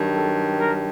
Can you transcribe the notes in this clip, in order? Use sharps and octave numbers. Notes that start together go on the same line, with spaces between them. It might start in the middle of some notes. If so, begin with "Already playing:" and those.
Already playing: G2 D#3 F#3
A4
A#4